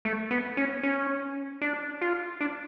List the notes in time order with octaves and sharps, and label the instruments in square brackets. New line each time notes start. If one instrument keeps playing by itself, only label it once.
[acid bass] A3
B3
C#4
C#4
D4
F4
D4